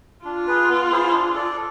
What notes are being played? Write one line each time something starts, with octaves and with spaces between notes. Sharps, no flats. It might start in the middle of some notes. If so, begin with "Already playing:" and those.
D4 F4
G#4 B4
B3
E4 G#4 C5
D4
A4 D5